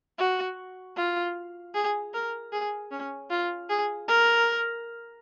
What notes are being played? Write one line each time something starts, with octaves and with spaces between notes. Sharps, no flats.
F#4
F4
G#4
A#4
G#4
C#4
F4
G#4
A#4